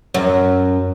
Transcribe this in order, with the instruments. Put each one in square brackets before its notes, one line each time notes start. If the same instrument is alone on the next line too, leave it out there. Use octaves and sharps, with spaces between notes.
[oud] F#2